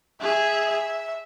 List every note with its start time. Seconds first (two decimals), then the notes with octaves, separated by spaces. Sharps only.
0.21 G#4 E5
0.65 E5